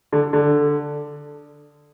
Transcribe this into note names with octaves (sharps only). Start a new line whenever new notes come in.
D3
D3